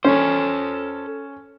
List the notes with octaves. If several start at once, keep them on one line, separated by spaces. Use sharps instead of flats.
C#4 A4 C5